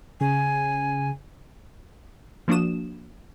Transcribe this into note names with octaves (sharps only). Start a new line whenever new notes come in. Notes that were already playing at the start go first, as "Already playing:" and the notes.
C#3 G#5
F3 A#3 D4 F#4 D#6 E7